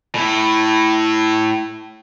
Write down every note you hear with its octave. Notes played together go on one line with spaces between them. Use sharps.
A2 E4